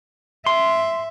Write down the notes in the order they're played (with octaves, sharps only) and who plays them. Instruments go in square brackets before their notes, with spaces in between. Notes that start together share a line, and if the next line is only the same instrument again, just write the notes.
[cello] E5 [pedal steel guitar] C6